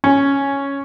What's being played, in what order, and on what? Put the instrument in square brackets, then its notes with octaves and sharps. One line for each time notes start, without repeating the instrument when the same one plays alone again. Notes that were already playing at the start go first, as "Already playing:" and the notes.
[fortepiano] C#4